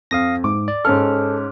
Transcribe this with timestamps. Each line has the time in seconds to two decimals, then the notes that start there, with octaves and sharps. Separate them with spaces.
0.11 F2 F5 D#6 A#6
0.44 G#2 D6
0.68 D5
0.85 G#2 C#4 A4 F6